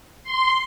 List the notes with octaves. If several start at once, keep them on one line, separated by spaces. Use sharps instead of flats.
C6